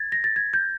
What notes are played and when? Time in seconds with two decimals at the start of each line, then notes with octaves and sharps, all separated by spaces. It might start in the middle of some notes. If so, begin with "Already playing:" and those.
Already playing: G#6 A6
0.12 A#6
0.24 A6
0.36 G#6
0.53 G6